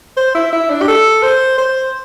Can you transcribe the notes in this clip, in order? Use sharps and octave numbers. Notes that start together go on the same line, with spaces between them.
C5
E4
E4
D4
G4
A4
C5
C5